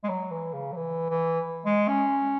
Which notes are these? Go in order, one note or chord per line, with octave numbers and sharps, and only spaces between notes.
G#3
F#3
E3
C#3
F#3
E3
E3
G#3
C#4